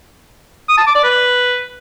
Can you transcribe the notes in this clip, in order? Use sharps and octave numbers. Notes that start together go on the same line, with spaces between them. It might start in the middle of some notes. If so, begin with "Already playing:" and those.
D#6
A5
D6
D5
B4